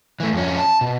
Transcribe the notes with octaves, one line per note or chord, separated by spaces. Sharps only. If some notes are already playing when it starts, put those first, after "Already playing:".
E3 A3
F2 C#4
A5
B2